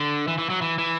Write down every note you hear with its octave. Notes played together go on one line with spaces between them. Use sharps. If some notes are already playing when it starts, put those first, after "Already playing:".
Already playing: D3
E3
E3
F#3
E3
E3